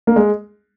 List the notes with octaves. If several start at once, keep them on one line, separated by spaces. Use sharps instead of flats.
A#3
G#3